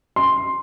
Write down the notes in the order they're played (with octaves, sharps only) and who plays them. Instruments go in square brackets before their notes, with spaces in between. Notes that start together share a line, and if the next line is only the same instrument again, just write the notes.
[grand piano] C6